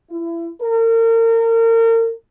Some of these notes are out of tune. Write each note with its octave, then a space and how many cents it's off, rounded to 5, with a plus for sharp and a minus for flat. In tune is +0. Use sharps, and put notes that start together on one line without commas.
E4 +30
A#4 -35